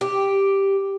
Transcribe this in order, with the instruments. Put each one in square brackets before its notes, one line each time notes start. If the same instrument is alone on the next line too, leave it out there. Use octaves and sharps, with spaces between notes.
[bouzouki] G4